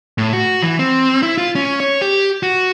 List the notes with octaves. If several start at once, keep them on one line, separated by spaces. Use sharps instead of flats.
A2
F#4
E3
C4
E4
F4
C#4
C#5
G4
F#4